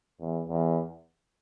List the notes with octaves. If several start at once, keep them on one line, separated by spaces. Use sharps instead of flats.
E2
E2